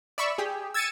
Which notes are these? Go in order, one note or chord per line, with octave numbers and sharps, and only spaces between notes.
D5 E5 B5 C#6 E6
G4 G#4
E6 G#6 A6 C#7 D#7 E7